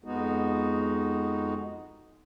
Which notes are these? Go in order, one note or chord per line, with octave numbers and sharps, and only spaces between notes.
F2 G#3 B3 D#4 F#4